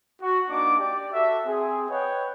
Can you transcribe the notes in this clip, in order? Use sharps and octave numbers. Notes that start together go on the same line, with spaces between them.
F#4
A#3 D4 D#4 D6
G4 D5
F#4 A4 E5
C4 G#4
B4 C#5 D#5 F#5 G5